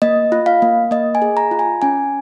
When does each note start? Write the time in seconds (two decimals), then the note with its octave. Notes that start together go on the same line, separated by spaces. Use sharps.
0.02 A#3 D#5
0.32 F4
0.46 F5
0.62 A#3
0.91 A#3 D#5
1.15 G#5
1.22 G#4
1.37 A#5
1.51 F4
1.59 G#5
1.82 C#4 G#5